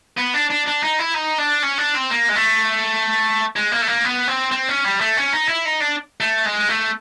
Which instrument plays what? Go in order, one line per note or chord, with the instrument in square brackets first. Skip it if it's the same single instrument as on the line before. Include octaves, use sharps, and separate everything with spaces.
[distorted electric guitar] B3
D4
D4
D4
D#4
E4
D#4
D4
C#4
D4
C4
A#3
G#3
A3
G#3
A#3
A3
A#3
B3
C4
C4
C#4
G3
A3
C#4
D#4
E4
D#4
D4
A3
G#3
A3